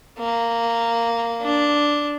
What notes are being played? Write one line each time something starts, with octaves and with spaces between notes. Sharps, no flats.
A#3
D4